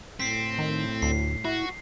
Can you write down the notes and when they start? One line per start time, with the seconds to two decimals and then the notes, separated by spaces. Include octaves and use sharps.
0.20 A2 C4 B6 C7
0.58 D#3
1.02 D2 C7
1.45 E4 F#4